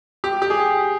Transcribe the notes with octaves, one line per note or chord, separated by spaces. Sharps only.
G4
G4
G#4